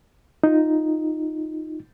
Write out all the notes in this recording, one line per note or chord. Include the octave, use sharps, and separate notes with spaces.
D#4 F4